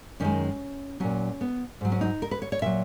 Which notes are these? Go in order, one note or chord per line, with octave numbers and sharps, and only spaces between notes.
F#2 D#3 G#3 C#4
A#2 F#3 C#4
B3
G#2 F#3
C#4
D#4
A#4
B4
C#5
C#5
A#2 F#3 E5